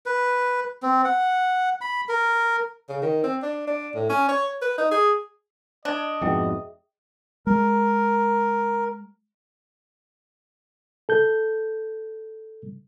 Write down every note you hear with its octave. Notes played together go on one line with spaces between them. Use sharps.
B4
C4
F#5
B5
A#4
C#3
D#3
C4
D4
D4
A2
C#4
C#5
B4
D#4
G#4
D4 D5 D#5 A5
F2 G#2 B2 G#4 E5 G5
G#3 A#4
A4 G6